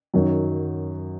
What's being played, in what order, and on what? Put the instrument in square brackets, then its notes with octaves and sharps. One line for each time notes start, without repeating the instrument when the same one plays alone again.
[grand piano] F#2 D#3 F#3